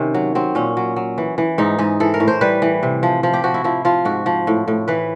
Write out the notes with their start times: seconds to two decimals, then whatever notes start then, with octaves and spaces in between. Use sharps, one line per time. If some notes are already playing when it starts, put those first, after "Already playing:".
Already playing: C3 D#3 C#4
0.14 F#3
0.35 F#3 C4
0.55 A#2 C#4
0.77 F#3
0.96 F#3
1.18 E3
1.38 E3
1.58 G#2 D#4
1.79 G#2 G#4
2.00 E3 A4
2.14 A#4
2.20 A2
2.28 C5
2.41 G3 B4
2.62 E3
2.83 C3
3.03 F3
3.23 F3
3.33 G4
3.44 F3 F#4
3.54 E4
3.64 F3 E4
3.85 F3 F4
4.05 G#2 F#4
4.26 F3
4.47 A2
4.68 A2
4.88 E3 B4